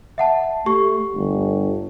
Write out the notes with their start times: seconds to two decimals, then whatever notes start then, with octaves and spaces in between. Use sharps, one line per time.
0.18 E5 F#5 A5
0.66 A3 G4 C#6
1.15 G1